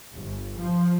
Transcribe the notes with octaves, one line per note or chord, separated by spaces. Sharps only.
G1
F3